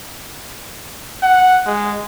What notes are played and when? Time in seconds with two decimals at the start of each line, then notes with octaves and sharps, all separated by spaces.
1.23 F#5
1.66 G#3